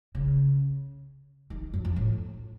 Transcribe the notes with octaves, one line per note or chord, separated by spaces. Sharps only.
C#3
D#3
F#2
F2
A2